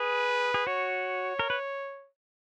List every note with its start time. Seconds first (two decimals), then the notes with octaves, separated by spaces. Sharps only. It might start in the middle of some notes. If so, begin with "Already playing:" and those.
Already playing: G#4 B4
0.54 G#4
0.67 F#4 C#5
1.39 A#4
1.50 B4